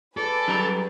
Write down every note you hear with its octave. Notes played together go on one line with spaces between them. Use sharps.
G#4 A4 B4 D5
F#2 G3 A#5